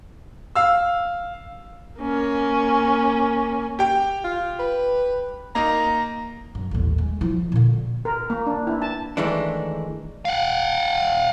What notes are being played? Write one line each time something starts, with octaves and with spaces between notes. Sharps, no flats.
F5 E6
A#3 C#4
G4 G5
F4
B4
A#3 D#4 A#5
F#2
A1 D#2
G#3
F3 E4
A#2 D3
A#4
A#3
D4
E4
A5
D#3 E3 G#3 A3 D4
F5 F#5